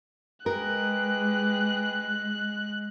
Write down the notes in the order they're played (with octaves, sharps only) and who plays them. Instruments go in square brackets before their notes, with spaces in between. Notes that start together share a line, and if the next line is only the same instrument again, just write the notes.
[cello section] G#3 [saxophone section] G4 G#4 B4 [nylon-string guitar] A#4 [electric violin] F#6